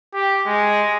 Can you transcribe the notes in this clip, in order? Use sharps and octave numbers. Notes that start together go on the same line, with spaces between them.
G4
G#3